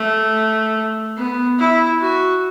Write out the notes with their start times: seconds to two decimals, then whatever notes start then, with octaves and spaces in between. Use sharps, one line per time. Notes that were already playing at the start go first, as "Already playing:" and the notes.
Already playing: A3
1.17 B3
1.59 E4
2.01 F#4